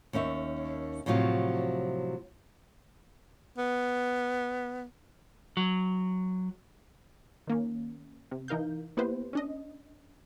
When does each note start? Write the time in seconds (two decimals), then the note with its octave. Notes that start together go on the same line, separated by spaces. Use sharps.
0.13 D#2 C#4 D#4 E5
1.06 A2 C3 F3 F#3 F4
3.58 B3
5.57 F#3
7.47 D#3 A#3 C#4
8.31 C3
8.48 E3 D#4 A#4 F5 G6
8.97 A#3 B3 E4 G4 B4 C5
9.33 C#4 D4 D#5